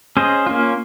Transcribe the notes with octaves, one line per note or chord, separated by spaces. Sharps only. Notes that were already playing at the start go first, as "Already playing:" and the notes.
C#4 G#4 C5 D#5
A#3 C#4 F4